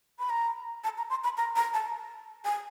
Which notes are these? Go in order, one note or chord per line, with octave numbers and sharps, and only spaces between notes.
B5
A#5
A5
A#5
C6
B5
A#5
A#5
A5
G#5